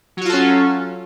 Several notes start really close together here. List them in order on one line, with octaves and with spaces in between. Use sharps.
F#3 F#4 F4 A4 C#4